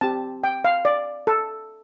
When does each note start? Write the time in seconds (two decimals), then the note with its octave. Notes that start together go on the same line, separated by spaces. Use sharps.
0.01 C4 G4 A5
0.44 G5
0.65 F5
0.85 D5
1.27 A4